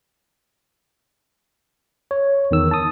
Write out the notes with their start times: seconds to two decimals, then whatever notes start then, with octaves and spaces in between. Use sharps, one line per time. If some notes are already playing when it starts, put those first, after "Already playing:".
2.11 C#5
2.51 E2 D#3 E6
2.71 A5 D#6